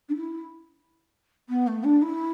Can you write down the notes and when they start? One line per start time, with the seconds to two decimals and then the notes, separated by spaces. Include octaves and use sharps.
0.09 D4
0.15 E4
1.49 B3
1.67 A3
1.83 D4
2.02 E4